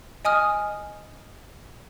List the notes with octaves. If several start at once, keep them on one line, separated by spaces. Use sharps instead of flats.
D#5 G#5 D#6 F6